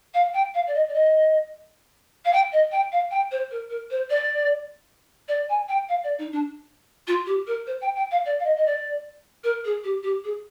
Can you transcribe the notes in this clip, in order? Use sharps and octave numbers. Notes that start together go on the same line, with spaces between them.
F5
G5
F5
D5
D#5
D5
D#5
F5
G5
D#5
G5
F5
G5
C5
A#4
A#4
C5
D5
D5
G#5
G5
F5
D5
D#4
D4
F4
G4
A#4
C5
G5
G5
F5
D5
F5
D#5
D#5
D5
A#4
G#4
G4
G4
G#4